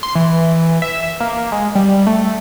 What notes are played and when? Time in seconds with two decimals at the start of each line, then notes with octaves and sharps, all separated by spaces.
0.03 C6
0.15 E3
0.82 E5
1.20 A#3
1.52 G#3
1.75 G3
2.07 A3